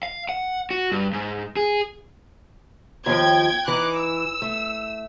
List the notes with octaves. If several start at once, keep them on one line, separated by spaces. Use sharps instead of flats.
F5
F#5
F#4
G2
G#2
G#4
D#2 F3 G5 G#6
E3 D#4 D6 F#6
E6
A3